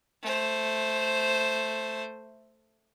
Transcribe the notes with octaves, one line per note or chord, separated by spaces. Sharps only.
A3 C5